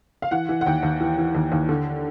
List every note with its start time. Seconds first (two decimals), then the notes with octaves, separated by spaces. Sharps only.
0.22 F5
0.31 E3 F#5
0.49 E3
0.61 F#5
0.66 D#2 G5
0.83 D#2
1.01 E3
1.18 E3
1.35 D#2
1.52 D#2
1.69 D3